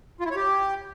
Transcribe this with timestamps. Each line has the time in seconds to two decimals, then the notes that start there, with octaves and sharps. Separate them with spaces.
0.20 F4
0.25 E4
0.31 C#5
0.36 G4